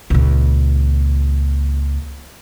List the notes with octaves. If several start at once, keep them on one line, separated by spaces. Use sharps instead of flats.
C#2 A#2